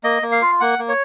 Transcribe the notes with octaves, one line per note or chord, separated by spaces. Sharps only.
A#3 D#5
A#3
F5
F4
A#3 F#5
A#3
C#5